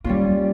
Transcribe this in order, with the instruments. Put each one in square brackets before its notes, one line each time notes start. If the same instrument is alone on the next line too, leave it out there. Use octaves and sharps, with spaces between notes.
[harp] G3 C#4 F4 [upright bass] A#3